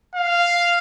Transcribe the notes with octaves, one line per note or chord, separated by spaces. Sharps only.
F5